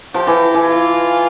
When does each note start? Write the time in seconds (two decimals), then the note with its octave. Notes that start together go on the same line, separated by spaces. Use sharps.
0.14 F3 G4
0.27 E3
0.54 E3
0.68 F4